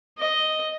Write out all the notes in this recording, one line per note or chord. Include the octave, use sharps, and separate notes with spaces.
D#5